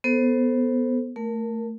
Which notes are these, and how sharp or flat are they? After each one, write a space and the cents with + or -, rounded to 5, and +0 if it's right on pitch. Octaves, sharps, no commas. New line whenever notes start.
B3 +0 A4 +5 C5 +0
A3 +15 A#4 +0